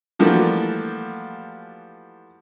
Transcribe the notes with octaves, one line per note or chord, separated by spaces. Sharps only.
E3 F3 G3 A3 A#3 F#4